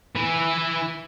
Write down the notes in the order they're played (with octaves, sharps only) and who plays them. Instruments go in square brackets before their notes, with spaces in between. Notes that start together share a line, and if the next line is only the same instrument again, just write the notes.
[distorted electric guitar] E3 E4